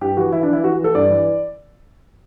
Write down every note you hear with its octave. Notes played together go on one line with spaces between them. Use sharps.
G2 G4
E3 F#4
E3 E4
D4
E3 E4
E3 F#4
E3
A4
G2 D5
E3